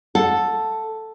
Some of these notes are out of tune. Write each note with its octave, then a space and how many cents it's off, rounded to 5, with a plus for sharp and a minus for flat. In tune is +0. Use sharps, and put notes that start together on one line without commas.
A4 +0 F#5 -25